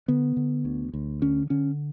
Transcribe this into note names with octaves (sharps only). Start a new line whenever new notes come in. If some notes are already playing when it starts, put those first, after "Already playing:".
D3 B3
D3
D2
D2
D3 C#4
D3 C#4